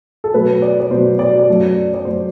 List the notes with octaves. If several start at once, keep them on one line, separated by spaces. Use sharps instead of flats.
A4
B2 F#3 A3 B4
D5
D5
B2 F#3 A3 C5
D5
D5
F#2 F#3 A3
D5
F#2 F#3 A3 C5